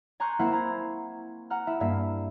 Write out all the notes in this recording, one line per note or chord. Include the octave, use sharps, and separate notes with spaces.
G#5 A#5 C6 C#6 F#6 G6
A#3 C4 E4 C5 E5 F#5
A#5 G#6
F#5 A#5 F6
E4 E5
G2 A#3 E5